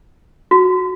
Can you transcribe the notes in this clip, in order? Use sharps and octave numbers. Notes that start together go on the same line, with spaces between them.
F#4